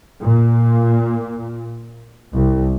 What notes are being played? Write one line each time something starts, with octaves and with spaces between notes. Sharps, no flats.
A#2
C2